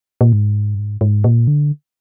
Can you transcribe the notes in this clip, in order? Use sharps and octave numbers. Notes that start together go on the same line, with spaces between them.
A#2
G#2
G2
G#2
G#2
A#2
D3